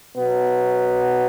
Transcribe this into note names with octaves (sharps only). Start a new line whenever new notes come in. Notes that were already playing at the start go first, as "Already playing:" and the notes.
B2 F#3 B3